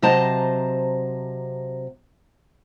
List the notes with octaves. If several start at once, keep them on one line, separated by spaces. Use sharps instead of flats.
C3 F#3 C5 D#5 A5 A#5